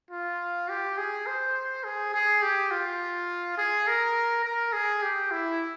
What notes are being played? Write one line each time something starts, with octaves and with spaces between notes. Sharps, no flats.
F4
G4
G#4
C5
G#4
G#4
G4
F4
G#4
A#4
A#4
G#4
G4
E4